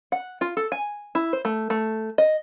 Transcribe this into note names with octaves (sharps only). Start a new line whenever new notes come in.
F#5
F4
A4
G#5
E4
C5
A3
A3
D#5